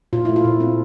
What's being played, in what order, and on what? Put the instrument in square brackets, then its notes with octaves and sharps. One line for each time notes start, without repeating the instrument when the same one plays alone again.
[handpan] A#2 F4
E4
A3
F4
A#2
C4 A4